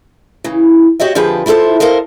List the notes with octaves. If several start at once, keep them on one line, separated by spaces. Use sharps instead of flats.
C#3 E3
F#4 G4 C#5 D#5 E5
F2 D3 F3 G4 G#4 B4
E4 F4 G4 A4 C5
A4 A#4 C5 D#5 F5